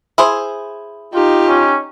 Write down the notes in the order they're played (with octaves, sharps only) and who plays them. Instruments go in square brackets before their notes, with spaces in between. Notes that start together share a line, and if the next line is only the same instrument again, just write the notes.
[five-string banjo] E4 G#4 C5
[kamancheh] D#4 G4 [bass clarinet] F4
[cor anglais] C#4